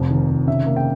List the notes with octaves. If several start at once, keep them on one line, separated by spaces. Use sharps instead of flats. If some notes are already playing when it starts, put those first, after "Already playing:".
Already playing: F1 F2
D#3
F1
C#3 E5
A#3
G5